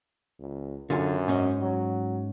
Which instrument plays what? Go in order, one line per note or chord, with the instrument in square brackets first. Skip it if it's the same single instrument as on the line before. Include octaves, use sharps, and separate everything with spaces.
[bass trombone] C#2
[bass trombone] F#2 [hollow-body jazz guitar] D3 F4 G#5
[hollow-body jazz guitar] G#2 C#4 D#5
[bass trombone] F#3